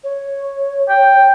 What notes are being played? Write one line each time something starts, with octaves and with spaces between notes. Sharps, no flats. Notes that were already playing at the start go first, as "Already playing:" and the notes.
C#5
G5